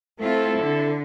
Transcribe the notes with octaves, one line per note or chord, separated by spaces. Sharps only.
A3 C4 E4 F4 A4
D3